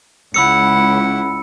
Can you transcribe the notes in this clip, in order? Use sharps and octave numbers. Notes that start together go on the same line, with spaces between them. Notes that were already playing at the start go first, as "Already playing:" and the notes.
C#2 E4 F#5 B5 E6 C#7